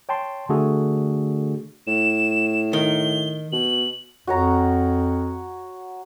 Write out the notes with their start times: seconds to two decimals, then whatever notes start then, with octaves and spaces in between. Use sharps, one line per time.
0.09 C#5 G5 A5 C6
0.49 D3 A3 D4 F#4 G#4 A4
1.87 A2 E7
2.73 D#3 G7
3.52 B2 F#7
4.27 F2 F#4 C#5 A#5